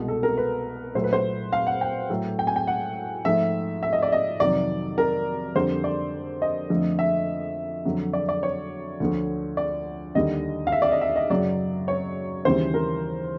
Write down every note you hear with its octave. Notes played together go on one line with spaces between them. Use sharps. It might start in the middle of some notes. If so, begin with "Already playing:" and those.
Already playing: C2 B2 G#3
A4
A#4
B4
A#2 F#3 A3 C5
B4
C5
F5
F#5
G5
A2 F#3 A3
G5
G#5
G5
F#5
G#2 F3 A3 E5
E5
D#5
D5
D#5
F2 C3 D#3 F#3 D5
A#4
F2 D3 G3 C5
D5
D#5
F2 D3 F3 A3
E5
F2 D3 F#3
D5
D5
C#5
D2 D3 F3
D5
D#2 D3 G3 D#5
F5
E5
D5
D#5
E5
D#5
F#2 C#3 F#3 D5
C#5
D#2 C#3 E3 G3 C5
A#4